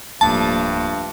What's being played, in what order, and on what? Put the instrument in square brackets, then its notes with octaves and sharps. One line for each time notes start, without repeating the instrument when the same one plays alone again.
[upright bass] D1 A#3 [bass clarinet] G2 [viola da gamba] F3 G3 A3 [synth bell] A5